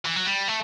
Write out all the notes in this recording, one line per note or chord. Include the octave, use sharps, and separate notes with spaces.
E3
F#3
G3
A3